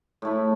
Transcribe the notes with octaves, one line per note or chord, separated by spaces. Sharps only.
A2 A3 E4